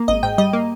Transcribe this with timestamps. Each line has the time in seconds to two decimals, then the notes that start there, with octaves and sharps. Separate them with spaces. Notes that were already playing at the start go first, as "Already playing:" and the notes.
Already playing: A#3
0.08 G#1 D#5
0.23 G#2 G5
0.38 G3 D#5
0.53 A#3